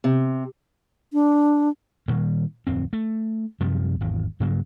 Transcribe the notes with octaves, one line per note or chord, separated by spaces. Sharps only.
C3
D4
A#2 D#3 G3 A#3
D1 F2 C4
A3
F#2 C3 F3 G3
G#1 E2
G2 C#3 F#3 A#3